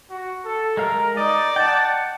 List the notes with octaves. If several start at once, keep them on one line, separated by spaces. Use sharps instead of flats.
F#4
A4
G#3 A#4 F5
D#4 D5 D#5
F#5 G5 A5